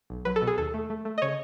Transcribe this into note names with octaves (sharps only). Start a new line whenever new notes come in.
B1
F#3 B4
A4
B2
G#4
D#2 A4
A3
A3
A3
D#5
C#3 C#5